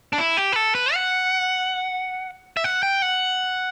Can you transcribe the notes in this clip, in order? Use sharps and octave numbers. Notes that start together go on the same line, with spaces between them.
D4
E4
G4
B4
A4
B4
F#5
E5
F#5
G5
F#5